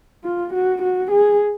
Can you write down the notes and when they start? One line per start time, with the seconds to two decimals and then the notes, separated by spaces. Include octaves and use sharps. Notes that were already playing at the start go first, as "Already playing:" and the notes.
0.25 F4
0.54 F#4
0.82 F#4
1.11 G#4